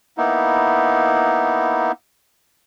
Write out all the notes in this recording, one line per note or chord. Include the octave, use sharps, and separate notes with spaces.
A#3 B3 D#4 E4